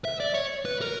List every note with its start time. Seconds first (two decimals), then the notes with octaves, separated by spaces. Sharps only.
0.05 E5
0.20 D5
0.34 C#5
0.65 B4
0.81 A#4